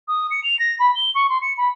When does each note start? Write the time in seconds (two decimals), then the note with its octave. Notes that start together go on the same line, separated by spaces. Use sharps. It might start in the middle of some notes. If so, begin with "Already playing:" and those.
0.08 D#6
0.31 C#7
0.44 F7
0.59 A#6
0.79 B5
0.95 G7
1.15 C#6
1.30 C6
1.42 C#7
1.58 B5